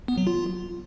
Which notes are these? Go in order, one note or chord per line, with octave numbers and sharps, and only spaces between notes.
B3
F#3
F4